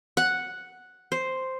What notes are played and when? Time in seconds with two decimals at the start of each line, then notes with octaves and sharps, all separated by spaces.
0.17 F#5
1.12 C5